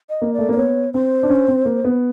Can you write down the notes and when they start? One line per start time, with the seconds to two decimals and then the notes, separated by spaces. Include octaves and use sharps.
0.09 D#5
0.22 A#3
0.34 A3 D5
0.49 A#3 D5
0.57 B3 C#5
0.94 C4 C5
1.23 D4
1.30 C#4
1.48 C4
1.65 A#3
1.84 B3